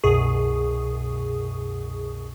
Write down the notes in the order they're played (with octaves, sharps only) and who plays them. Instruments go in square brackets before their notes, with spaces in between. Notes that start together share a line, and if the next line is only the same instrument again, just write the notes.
[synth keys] C2 F#2 B2 G#4 C#6 D#6